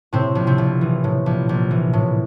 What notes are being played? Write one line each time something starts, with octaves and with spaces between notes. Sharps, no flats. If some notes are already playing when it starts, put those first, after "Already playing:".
A2 C3 C4
A#1
C3 C4
A#1
E3
A2
A#1
A#1
E3
A2